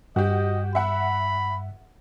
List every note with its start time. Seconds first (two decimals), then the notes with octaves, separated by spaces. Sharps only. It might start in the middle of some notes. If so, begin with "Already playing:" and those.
0.16 G2 F#4 G4 D#5
0.75 E5 F#5 B5